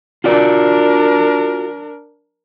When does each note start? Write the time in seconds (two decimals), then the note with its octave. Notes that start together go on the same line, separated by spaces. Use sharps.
0.24 D4 F4 F#4 A#4 D5